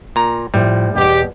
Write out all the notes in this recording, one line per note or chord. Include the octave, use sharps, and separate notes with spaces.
A#2 A#5
A2 F3 G3
E2 G#2 B2 G4